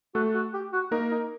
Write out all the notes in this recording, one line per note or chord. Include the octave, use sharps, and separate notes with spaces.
A3 F#4 A4
F#4
G4
F#4
A#3 D#4 A#4
D#4